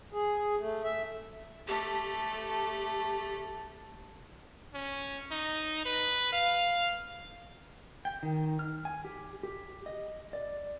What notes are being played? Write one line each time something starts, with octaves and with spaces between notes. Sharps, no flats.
G#4
A3
E5
A3 G4 A4
C#4
D#4
B4
F5
G5
D#3
F6
G#5
G4
G4
D#5
D5